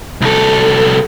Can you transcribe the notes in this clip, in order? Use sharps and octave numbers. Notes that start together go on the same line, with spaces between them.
C2 A4